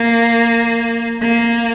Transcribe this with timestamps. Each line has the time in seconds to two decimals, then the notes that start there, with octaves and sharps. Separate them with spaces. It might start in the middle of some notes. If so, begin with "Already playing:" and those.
Already playing: A#3
1.21 A#3